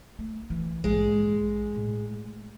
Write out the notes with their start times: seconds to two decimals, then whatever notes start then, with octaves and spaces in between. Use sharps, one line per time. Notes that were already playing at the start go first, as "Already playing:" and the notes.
0.19 A3
0.50 E3
0.84 A#1 G#2 G#3
1.74 A2 A3